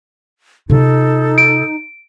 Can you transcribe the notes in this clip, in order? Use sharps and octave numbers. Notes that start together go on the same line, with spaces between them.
C3 D#4 F4 A4
D7